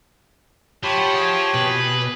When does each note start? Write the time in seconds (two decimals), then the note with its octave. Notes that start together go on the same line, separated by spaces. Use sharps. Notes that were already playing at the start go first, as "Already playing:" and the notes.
0.84 F3 G4 C#5 A5 B5
0.98 F#5
1.15 G#4 G5
1.54 B2 B4